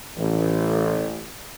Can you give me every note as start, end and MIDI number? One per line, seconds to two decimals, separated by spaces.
0.17 1.24 33